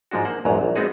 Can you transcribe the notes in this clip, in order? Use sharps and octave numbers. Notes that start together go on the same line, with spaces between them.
G#2 F3 G#3 D4 F#4
A#3 C5 F#5
A#1 E2 G#2 F#3 A#5
A#1
G#3 B3 C4 D#4 F#4 G#4